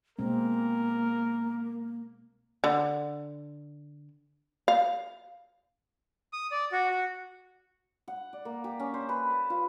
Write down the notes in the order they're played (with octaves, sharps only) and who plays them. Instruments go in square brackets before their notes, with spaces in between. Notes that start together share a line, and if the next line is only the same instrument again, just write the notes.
[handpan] B2 G#3 C4 [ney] A#3 [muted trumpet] A#4
[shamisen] D3
F5
[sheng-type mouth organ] D#6
D5
F#4
F#4
[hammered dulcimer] F#5
D5
A#3
G4
C#4
C5
B4
A5
F4